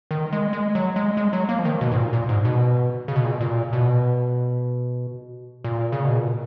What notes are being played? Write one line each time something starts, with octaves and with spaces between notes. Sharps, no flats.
D#3
G#3
G#3
F#3
G#3
G#3
F#3
A#3
F3
D#3
B2
G#2
A#2
A#2
G#2
B2
C#3
B2
A#2
B2
A#2
B2
A#2
C#3
B2
A#2